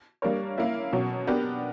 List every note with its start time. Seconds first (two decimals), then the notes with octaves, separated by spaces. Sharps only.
0.22 G3 A#3 D4 A#4 C#5
0.58 A#3 C#4 E4 A#4
0.93 B2 F#3 C#4
1.27 B3 D4 G4 A#4